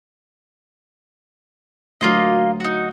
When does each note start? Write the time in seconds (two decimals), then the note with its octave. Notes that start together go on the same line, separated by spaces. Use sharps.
2.01 D2 F#3 A#3 F4 D#5
2.60 D#4 F#4